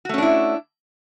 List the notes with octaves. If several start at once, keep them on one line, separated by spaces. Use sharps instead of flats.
A3 C#4 D4 E4 F#4